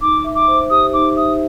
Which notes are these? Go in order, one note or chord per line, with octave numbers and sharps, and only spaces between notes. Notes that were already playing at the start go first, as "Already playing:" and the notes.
D#4 D6
E5
D6
C5
G4 D#6
D#4 D6
E5 D#6